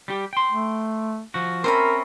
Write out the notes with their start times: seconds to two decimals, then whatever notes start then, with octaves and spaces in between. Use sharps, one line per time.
0.08 G3 G4
0.33 G5 C6
0.51 A3
1.34 F3 F#4
1.64 C4 C#4 A#4 C5 E5 B5